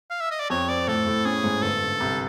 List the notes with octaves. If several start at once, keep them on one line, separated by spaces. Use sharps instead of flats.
F5
E5
D#5
D5
F2 C#5
C4 D5
A2 A4
A2
C#4 G#4
G#2
G1 A4
G1
C2